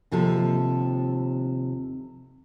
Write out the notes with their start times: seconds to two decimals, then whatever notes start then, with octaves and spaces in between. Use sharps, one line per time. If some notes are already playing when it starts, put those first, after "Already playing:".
0.12 D#2 C3 F3 A4